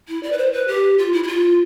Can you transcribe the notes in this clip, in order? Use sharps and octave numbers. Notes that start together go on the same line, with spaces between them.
E4
D5
B4
C5
B4
G4
F4
E4
E4
F4